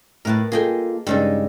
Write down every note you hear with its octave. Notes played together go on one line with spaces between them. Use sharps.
A2 E4 A#4 B4 A5
A#3 F4 G#4 A4 D#5 G5
G2 C#3 G3 G#3 D#4 A4